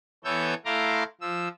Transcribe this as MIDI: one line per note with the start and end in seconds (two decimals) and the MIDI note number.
0.24 0.54 52
0.24 0.54 59
0.24 0.54 69
0.24 0.54 73
0.24 0.54 88
0.24 0.54 91
0.65 1.04 57
0.65 1.04 64
0.65 1.04 77
0.65 1.04 82
0.65 1.04 84
0.65 1.04 86
1.21 1.48 53
1.21 1.48 88